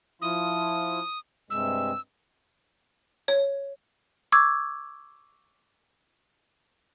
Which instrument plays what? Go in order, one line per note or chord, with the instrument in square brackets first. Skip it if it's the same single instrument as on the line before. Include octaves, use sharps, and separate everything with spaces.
[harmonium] F3 E4 F4 [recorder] D#6
[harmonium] G2 C3 G#3 [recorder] E6
[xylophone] C#5
C#6 D6 E6 G#6